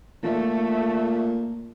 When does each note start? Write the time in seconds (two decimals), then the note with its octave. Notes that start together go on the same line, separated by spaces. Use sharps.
0.23 A#2 A3